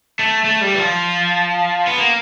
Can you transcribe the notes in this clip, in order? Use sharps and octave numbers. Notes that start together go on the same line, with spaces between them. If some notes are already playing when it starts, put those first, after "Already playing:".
A3
A3
G3
E3
F3
B3
A#3